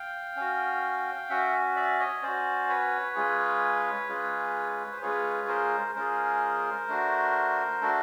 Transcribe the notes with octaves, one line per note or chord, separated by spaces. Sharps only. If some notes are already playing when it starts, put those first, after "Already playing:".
Already playing: F5 G5
C#4 F#4
C#4 F#4 E5 F#5
D5 E5
C#5 D#5
C#4 F#4 C5 D5
B4 C#5
G#3 C#4 F4 G#4
G#3 C#4 F4 G#4
C5
G#3 C#4 F4 G#4 B4 C#5
A#4 C5
G#3 C#4 F4 G#4 A#4 C5
A3 D4 F#4
A3 D4 F#4 A4